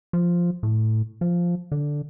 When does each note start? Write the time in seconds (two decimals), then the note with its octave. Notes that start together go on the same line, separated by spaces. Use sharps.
0.13 F3
0.63 A2
1.21 F3
1.72 D3